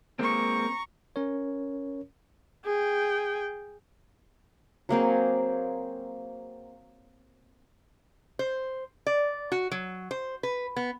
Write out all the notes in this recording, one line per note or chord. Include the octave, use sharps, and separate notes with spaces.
G#3 A#3 C4 A#5 C#6
C#4 A#4 C#5
G#4 G5
F#3 A#3 C4 G#4
C5
D5
F#4
F#3
C5
B4
B3